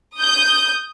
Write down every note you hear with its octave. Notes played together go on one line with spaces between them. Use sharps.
D#6 G6